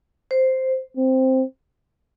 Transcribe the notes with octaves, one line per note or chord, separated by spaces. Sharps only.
C5
C4